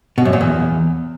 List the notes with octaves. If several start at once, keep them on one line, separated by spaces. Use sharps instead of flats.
B2
F#2
A#2
E2